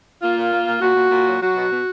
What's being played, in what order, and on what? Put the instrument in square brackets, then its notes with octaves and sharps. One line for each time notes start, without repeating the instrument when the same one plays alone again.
[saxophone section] A#3 F4
A#2
A#3
A#2
A#2 F#4
A#2
A#2
F#3
F#3 F#4
B2
B2